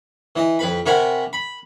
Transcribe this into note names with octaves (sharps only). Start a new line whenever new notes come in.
E3 D#5
F2 B4 B5
C3 F#4 A#4 G#5 B5
B5